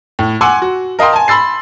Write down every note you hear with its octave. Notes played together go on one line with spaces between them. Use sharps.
A2
F#5 G#5 C6 D6 E6
F#4
A#4 D#5 F5 G5 C6
G#5 A5
B5 C6 E6 A6 C7